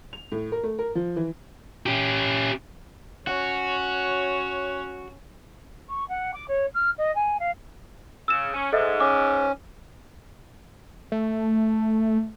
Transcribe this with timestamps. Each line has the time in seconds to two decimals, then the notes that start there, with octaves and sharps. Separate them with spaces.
0.13 F7
0.32 A2
0.52 A#4
0.63 A3
0.79 A#4
0.95 F3
1.16 E3
1.86 C#4 G4
3.27 C#4 F#4 C#5
5.89 C#6
6.08 F#5
6.33 D6
6.48 C#5
6.74 F6
6.98 D#5
7.15 G#5
7.39 F5
8.28 C#3 E6 E7
8.53 C#4
8.72 G#2 A4 D#5 E5
9.00 C#4 D6
11.12 A3